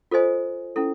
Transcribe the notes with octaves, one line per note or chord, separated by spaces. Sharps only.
F4 A4 C5 D#5 G#5
C#4 E4 A4